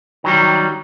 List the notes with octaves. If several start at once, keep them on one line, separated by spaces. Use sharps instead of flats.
D#3 F#3 G3